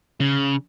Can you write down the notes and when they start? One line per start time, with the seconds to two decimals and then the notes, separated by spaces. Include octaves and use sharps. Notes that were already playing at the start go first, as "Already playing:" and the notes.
0.20 C#3